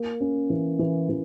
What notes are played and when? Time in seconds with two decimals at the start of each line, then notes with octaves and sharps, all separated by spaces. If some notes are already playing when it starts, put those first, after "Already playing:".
Already playing: A#3
0.20 C#4
0.50 E3
0.79 E3
1.09 E3